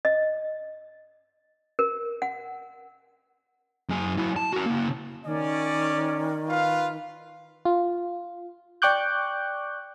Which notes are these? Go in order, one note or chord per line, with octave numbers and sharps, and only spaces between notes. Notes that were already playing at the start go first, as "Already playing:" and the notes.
D#5
A#4
F#5
F#2 G#4
F#3 E4
A5
F#4 A#4
C#3 A#3
D#3 C#4 D5
F4 B4 F5
F4
D5 G5 C#6 D6 F#6 G6